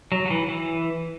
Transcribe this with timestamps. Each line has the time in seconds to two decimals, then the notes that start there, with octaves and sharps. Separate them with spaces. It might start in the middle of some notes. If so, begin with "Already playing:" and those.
0.12 F#3
0.26 F#3
0.30 E3
0.48 E3